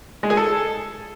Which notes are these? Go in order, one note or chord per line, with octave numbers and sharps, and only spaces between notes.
G#3
G#4
A4